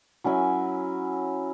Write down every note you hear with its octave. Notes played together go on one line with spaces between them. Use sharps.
F#3 C#4 E4 G#5